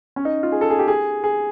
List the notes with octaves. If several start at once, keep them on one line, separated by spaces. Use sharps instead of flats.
C#4
D#4
F4
G#4
A4
G#4
G4
G#4
G#4